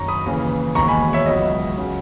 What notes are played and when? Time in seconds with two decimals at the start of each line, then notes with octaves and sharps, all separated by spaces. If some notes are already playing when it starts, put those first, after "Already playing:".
Already playing: F#1 F#2 D#3 A#5 C#6
0.08 B5 D#6
0.26 D#2 C#3 E3
0.75 E1 D#2 D#3 A#5 C#6
0.88 G#5 B5
1.13 C#5 E5
1.26 C#2 B2 F#3 D#5
1.77 C#3 F#3